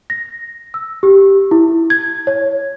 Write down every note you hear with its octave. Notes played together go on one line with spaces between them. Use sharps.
A#6
E6
G4
E4
G#6
C#5